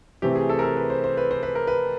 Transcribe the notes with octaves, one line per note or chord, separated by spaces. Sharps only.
C3 E3 A3 C4 G4
G#4
A4
A#4
A4
B4
C5
C5
B4
C5
B4
A#4
B4